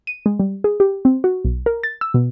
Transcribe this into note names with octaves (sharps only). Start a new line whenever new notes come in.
D#7
G#3
G3
G#4
G4
C4
F#4
B1
A#4
A6
E6
B2